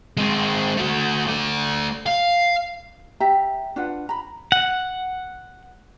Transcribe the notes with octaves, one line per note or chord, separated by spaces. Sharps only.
G#3 C4
A3 F#4
A3 D5
F5
G4 E5 A#5
D4 F4 B4 F#5
A#5 B5
F#5